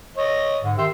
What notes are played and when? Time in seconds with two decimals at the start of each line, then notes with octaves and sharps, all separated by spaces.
0.17 C#5 D#5
0.63 G#2 D3
0.78 D#3 G4 E5 C6